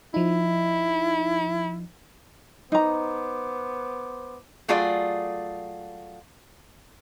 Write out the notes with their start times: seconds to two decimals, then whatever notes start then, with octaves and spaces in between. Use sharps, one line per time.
0.14 F3 D#4 E4
2.72 B3 D#4 C5 A#5 D6
4.68 F#3 A3 F4 G#4 D5